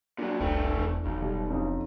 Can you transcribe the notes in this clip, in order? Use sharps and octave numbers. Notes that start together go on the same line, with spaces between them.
A#2 F#3 D4 D5
F1 C2 A3 C4
E1 E2
E1 B1
B2 G3
F2 C#4 D#4